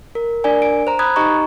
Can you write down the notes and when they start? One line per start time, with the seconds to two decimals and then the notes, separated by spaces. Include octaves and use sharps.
0.15 A#4
0.44 D4 A#4 D5 G#5
0.62 D7
0.87 C5 A#5
0.99 B5 D#6 F#6 G#6
1.16 D#4 G4 D#5 A#5 C#6